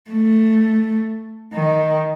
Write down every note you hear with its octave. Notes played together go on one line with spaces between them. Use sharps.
A3
D#3